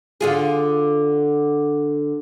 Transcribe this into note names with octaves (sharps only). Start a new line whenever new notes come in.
D3 F4 G#4